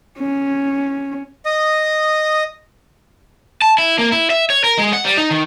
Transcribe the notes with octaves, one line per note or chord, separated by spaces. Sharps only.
C#4
D#5 D#6
A5
E4
A#3
E4
E5
C#5
A#4
G#3
F#5
G3
D#4
D#3